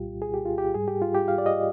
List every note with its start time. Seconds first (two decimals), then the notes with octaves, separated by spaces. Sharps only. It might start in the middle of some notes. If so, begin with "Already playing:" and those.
Already playing: C2 A#2 G3 F4 G4
0.22 G#4
0.34 G4
0.46 F4
0.58 G4
0.74 G#2 G3 G#4
0.88 G4
1.02 F4
1.15 G4
1.28 F5
1.38 D5
1.46 D#5